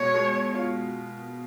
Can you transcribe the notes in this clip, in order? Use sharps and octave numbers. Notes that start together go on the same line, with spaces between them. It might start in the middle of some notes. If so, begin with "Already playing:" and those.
Already playing: B2 G#3 C#5
G#3
F4